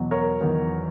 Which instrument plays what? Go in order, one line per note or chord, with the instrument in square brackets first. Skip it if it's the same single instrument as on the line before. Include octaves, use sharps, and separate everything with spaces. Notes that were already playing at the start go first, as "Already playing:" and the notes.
Already playing: [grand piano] E2 B2 F#3
A#4 C#5
E2 D#3 F#3